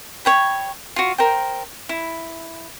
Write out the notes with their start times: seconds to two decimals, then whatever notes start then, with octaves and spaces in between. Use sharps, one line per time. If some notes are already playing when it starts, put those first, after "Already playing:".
0.25 C#5 G5 B5
0.96 F4 F#4
1.18 A#4 C5 G5
1.89 E4